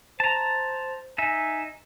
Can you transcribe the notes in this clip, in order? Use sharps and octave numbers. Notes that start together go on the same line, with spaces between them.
C5 A5 A#5
D#4 E5 G#5